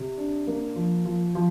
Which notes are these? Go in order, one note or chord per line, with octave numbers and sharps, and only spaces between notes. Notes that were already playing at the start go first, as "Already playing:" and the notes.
Already playing: C3
D4
A#3
F3
F3
F3